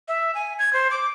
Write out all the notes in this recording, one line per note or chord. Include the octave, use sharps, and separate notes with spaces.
E5
G#5
G#6
C5
D6